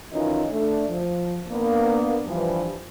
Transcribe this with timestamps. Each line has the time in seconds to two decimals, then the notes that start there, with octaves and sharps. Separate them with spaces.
0.12 F#2 D#3 E3 C#4 D#4 F4
0.51 A3 D4
0.89 F3
1.48 A#3 B3 D4
2.26 G2 E3 F3